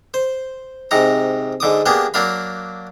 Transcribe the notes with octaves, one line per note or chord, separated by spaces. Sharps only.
C5
G#2 C3 F#5 A#5
G#2 D3 D6 D#6
A#3 B3 D4 G4 G#4
F#3 A#3 D4 F5 B5